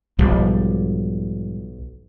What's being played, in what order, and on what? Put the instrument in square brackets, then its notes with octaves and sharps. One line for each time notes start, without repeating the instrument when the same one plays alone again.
[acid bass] B1 [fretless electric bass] G#2 F3 G3